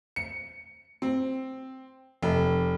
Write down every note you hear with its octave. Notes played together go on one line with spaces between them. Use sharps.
C#7
C4
F1